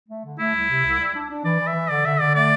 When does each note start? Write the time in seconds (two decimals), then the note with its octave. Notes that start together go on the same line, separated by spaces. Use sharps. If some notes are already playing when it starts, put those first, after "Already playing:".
0.09 A3
0.25 D3
0.39 A3 E4
0.55 C2
0.70 C3
0.85 C2
0.99 G3
1.15 D4
1.30 D4
1.44 E3 D5
1.60 E3
1.68 E5
1.75 E3
1.90 D3 D5
2.05 D3 E5
2.20 D3 D5
2.35 A3 D5